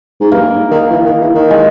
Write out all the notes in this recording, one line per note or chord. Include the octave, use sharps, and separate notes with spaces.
G#2
G2 A#3
D#3
E3
D#3
E3
D#3
G#3